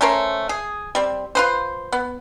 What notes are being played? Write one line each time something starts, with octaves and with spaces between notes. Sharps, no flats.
A3 C#4 A#4 C5
G#4
G3 C4
F4 B4 C5
B3